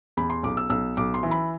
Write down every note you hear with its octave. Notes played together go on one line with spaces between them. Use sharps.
E2 B5
C6
B1 D6
E6
B1 E6
B1 D6
C6
E3
B5